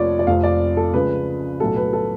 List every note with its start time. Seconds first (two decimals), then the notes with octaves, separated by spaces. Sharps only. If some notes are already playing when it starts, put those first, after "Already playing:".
Already playing: F1 F2 F3 C#5 D5
0.19 D5
0.27 F1 F2 F3 F5
0.44 D5
0.77 A4
0.93 C#2 C#3 F3 B4
1.60 B1 A2 F#3 A4
1.76 B4
1.93 A4